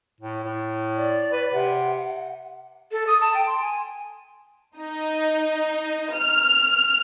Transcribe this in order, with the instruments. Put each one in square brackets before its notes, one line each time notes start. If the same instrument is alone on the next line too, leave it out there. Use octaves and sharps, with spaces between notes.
[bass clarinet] A2
A2
[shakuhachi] D5
[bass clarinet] B4
[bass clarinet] C3 [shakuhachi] F#5
[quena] A4
D#6
A5
G5
C6
G#5
[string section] D#4
F6